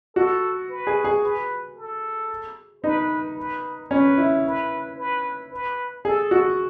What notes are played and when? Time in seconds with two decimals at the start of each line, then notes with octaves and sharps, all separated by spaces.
0.15 F#4 A4
0.69 B4
0.87 G#4
1.04 G#4
1.23 B4
1.77 A4
2.83 D#4 B4
3.37 B4
3.90 C#4 B4
4.18 E4
4.45 B4
4.98 B4
5.51 B4
6.05 G#4 A4
6.31 F#4